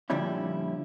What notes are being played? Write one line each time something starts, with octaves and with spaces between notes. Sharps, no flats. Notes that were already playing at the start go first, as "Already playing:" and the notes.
A#2 D3 F3 G3 C#4 E4